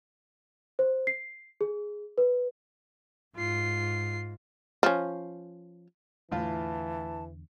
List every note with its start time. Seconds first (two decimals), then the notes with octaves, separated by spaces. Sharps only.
0.79 C5
1.07 C7
1.61 G#4
2.18 B4
3.37 G#2 F4 C7
4.83 F3 C#4
6.32 E2 A2 D3 E3 F4 A5